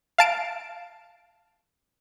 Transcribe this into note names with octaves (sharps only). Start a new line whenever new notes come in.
F5 A5 D7